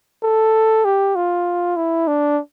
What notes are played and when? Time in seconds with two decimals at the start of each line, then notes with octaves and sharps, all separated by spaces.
0.23 A4
0.85 G4
1.16 F4
1.77 E4
2.08 D4